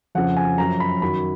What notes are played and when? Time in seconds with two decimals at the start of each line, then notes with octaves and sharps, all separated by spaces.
0.15 F2 C#3 F3 F#5
0.37 G#5
0.58 F#2 F3 A#5
0.80 B5
1.02 F#2 D#3 F#3 B5